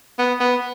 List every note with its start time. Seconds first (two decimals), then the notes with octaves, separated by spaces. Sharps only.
0.19 B3
0.40 B3